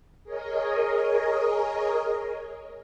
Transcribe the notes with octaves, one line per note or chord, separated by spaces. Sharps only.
G#4 A#4 C#5 D#5